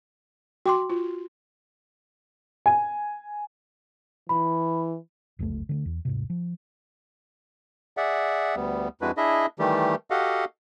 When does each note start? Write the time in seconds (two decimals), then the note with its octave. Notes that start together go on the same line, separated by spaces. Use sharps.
0.66 F#4 G5 C6 D6
0.90 F4
2.66 G#5
4.29 E3 B5
5.39 F1 C#2 F#2 A3
5.69 D3 F#3 A3
5.86 E2
6.05 D#1 G#2 C3
6.30 F3
7.97 G#4 D5 E5 F#5
8.56 D2 G3 B3
9.01 F2 G#3 D4 E4 F#4 B4
9.17 D4 E4 G#4 D#5 E5
9.59 D#3 E3 G3 A3 G4
10.11 F#4 G4 A4 D#5 F5 F#5